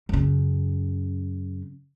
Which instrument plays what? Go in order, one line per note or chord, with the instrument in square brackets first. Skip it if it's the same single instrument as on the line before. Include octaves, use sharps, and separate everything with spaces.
[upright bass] F#2 C#3